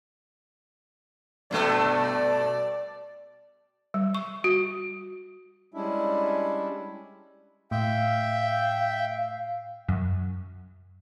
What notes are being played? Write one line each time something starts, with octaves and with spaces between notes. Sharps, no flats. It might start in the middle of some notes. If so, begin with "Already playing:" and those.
G2 B2 A3 D5
G3
C#6
F#4
G3 G#3 C#4 D4 E4 E5
A2 E5 F5 G5
F#2